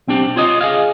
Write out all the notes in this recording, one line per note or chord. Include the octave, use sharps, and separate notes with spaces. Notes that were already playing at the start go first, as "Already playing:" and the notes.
B1 C4 D4 G4
F4 C#5 D#5
G#4 D#5 F5